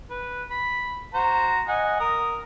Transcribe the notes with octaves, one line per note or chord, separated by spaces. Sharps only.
B4
B5
F#4 C5 A#5
D#5 F#5 G#5
A#4 D#6